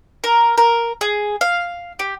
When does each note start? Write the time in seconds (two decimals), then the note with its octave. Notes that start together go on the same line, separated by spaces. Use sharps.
0.24 A#4
0.58 A#4
1.01 G#4
1.41 F5
1.99 G4